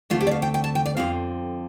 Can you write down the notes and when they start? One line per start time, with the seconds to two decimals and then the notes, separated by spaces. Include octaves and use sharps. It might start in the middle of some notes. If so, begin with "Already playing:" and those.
0.10 D2 D3 A3 C4 F4
0.21 G4
0.27 D5
0.31 F5
0.42 G5
0.54 G5
0.64 A5
0.75 G5
0.86 D5
0.97 F2 D3 F3 C4 F5